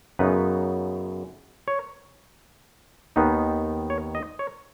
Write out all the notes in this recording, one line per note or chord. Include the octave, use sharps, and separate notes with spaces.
F#2 C#3 B3 D#4 B4
C#5
D#2 D#3 B3 D#4
C#5
D#5
C#5